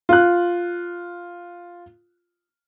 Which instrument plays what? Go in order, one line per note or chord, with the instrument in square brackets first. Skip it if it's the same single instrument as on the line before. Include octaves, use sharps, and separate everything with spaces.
[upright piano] F4 F#6